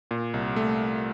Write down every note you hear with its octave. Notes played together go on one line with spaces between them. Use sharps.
A#2
C2
A3